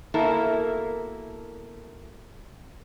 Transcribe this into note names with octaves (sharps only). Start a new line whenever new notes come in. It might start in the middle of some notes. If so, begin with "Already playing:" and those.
B2 A#3 E4 A4 A#4